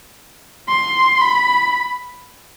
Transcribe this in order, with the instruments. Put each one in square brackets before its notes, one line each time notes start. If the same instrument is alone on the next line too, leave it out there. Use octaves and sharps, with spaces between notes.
[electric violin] C6
B5